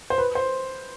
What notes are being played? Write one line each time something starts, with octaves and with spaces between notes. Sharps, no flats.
C5
B4
C5